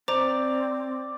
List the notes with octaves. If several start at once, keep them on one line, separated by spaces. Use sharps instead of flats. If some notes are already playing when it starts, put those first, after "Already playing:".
C4 C5 D5 A#5